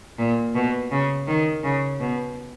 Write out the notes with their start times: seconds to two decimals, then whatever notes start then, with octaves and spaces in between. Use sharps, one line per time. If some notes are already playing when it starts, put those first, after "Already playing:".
0.19 A#2
0.55 B2
0.91 C#3
1.28 D#3
1.64 C#3
2.00 B2